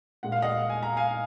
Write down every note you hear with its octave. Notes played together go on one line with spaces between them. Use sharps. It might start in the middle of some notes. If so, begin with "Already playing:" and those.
A#2 G#3 F#5
F5
D#5 F#5
G#5
A#5
F5 G#5